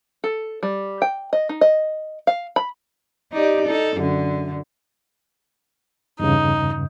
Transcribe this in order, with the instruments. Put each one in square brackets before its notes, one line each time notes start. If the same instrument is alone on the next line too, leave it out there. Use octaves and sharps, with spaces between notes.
[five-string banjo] A4
G3
G5
D#5
D#4
D#5
F5
B5
[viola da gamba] D#4 G4 D5
D#4 A4
F#2 D3
[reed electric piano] E2 G2 C#3 [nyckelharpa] D#4